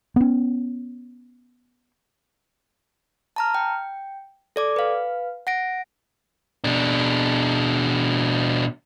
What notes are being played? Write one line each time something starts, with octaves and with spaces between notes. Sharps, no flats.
B3 C#4
A5 A#5 F6
G5
A4 D5 D6
B4 F5
F#5 A#6 D7
B2 D4